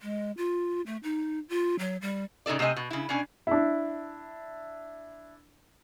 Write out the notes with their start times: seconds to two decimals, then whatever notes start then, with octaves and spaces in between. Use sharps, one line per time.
0.02 G#3
0.37 F4
0.86 A3
1.03 D#4
1.49 F4
1.79 F#3
2.02 G3
2.46 A2 C#3 D#4 A4 D5
2.59 C3 A3 C4 D#5 G#5
2.76 B2
2.91 C#3 E4
3.09 B2 C#4 D4 G#5
3.47 D4 E4